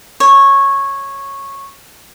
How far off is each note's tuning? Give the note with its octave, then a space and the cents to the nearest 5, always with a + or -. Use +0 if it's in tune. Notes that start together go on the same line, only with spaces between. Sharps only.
C#5 -10